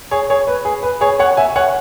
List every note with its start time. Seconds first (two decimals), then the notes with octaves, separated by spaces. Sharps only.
0.11 G#4 C#5
0.30 G#4 C#5
0.47 B4
0.65 G#4
0.83 B4
1.01 G#4 C#5
1.19 C#5 F#5
1.37 E5 G#5
1.56 C#5 F#5